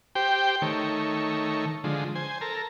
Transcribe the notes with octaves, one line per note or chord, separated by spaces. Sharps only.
G4 C5 G5
D#3 A3 C#5
D3 F3 G#3
C5 G#5
A4 A#4